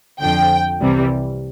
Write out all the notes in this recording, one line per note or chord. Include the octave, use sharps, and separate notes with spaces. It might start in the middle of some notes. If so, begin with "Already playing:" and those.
F2 D3 F3 G5
C2 C3 E3 G3